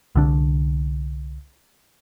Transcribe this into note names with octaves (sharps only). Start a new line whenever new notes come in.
C2 D3 D4